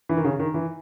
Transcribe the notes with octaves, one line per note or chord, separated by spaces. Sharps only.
E3
D#3
C#3
D#3
E3